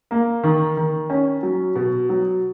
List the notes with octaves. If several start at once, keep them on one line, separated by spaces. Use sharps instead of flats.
A#3
D#3
D#3
C#4
F#3
B2
F#3